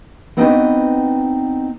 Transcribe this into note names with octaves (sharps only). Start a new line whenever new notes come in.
B3 C4 D4 D#4 F#4 B4